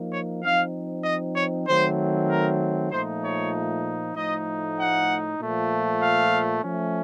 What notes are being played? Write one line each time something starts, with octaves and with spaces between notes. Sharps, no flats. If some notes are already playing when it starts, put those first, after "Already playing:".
Already playing: F3 A#3 D#4
C#5
F3 C4 D#4 F5
D#5
C#5
D#3 F#3 A3 C4 C5
A#4
A#2 F3 A3 D#4 C5
C#5
A2 F3 A3 D#4 D#5
F#5
A#2 F3 A3
F5
F3 A3 C#4